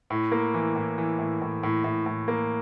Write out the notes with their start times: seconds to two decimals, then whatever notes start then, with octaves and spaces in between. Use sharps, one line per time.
0.10 A2
0.32 A#3
0.54 E3
0.76 A2
0.98 E3
1.19 A2
1.42 A2
1.63 A2
1.84 A2
2.06 A2
2.28 A#3